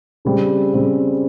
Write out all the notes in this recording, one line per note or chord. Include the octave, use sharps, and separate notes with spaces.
C#3 G3 C4
C#3 G3 C4